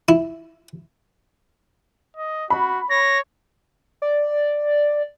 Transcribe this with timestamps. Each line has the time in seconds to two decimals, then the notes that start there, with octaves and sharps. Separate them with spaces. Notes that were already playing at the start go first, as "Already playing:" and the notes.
0.09 E4
2.17 D#5
2.50 F#4 B5
2.90 C#5 A#6
4.02 D5